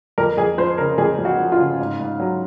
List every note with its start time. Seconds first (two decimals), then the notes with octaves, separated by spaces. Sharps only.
0.18 F2 A#4
0.37 F2 G#4
0.58 F3 C5
0.78 C#3 A#4
0.98 F2 G#4
1.18 F2
1.25 F#4
1.38 F3
1.52 F4
1.59 C#3
1.79 G#2
1.99 G#2
2.20 F#3